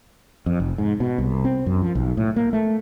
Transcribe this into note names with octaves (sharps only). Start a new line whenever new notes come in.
F2
F1
G#2
B2
C2
C4
F#2
F3
B1
A2
A#3
A3